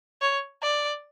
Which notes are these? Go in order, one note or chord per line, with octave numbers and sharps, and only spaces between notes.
C#5
D5